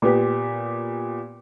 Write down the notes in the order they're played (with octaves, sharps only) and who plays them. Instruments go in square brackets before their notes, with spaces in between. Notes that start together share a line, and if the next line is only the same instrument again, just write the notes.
[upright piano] A#2 B3 G4